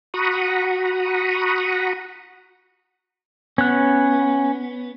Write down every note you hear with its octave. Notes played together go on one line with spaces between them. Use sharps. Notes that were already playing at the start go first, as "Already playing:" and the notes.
F#4 F#5 A#5 B5 C#6 D#6
B3 C#4 F#6